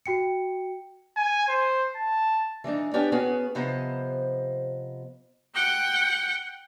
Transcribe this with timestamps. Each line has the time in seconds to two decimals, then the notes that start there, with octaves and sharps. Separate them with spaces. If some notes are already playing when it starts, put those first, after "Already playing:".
0.06 F#4 G5 C#7
1.17 G#5
1.48 C5
1.96 A5
2.64 E3 G#3 D4 D#4
2.94 B3 C#4 D4 G4 G5
3.12 B3 C#4 F#4 G#4
3.55 C3 F3 B3 C5 D#5
5.55 F#5 G5